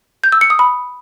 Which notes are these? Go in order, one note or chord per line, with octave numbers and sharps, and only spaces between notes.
G6
E6
C#7
D#6
B5